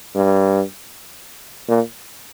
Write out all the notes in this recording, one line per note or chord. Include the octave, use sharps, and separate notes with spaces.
G2
A#2